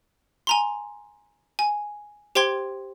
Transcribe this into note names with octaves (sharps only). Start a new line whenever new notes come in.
G#5 A#5 C6
G#5
G4 C5 G5 C6 G#6